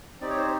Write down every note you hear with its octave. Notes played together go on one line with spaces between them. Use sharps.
C4 D#4 G4 D5
C#5
C5